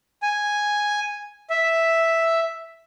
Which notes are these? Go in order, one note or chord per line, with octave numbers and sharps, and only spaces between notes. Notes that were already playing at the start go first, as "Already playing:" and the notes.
G#5
E5